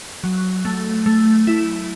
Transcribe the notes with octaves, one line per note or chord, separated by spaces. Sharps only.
F#3
A3
A3
E4